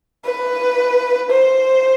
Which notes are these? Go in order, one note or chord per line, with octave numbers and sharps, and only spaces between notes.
B4
C5